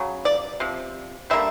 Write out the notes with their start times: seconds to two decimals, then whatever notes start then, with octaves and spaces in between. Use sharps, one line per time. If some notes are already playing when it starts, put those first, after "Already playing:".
Already playing: C#3 F#3
0.25 D5
0.60 C3 F3
1.30 D3 G3 A#3 E5